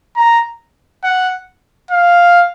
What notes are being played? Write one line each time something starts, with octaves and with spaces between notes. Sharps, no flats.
A#5
F#5
F5